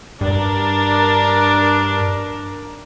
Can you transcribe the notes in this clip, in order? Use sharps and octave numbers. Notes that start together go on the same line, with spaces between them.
G2 D4 A#4